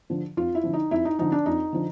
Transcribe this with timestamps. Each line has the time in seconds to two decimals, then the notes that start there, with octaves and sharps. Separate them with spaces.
0.10 D3 F3
0.37 F2 F4
0.55 E4
0.63 D3 F3
0.73 D#4
0.91 F2 E4
1.05 D#4
1.19 D3 F3 D#4
1.32 D4
1.46 F2 D#4
1.73 D3 F3